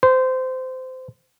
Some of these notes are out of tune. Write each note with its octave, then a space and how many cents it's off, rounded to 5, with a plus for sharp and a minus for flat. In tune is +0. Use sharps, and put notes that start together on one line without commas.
C5 -20